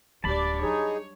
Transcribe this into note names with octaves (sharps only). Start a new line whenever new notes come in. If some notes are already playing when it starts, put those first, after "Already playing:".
D1 D2 G3 D4 D5 A5 B5
F#3 D#4 G#4 C#5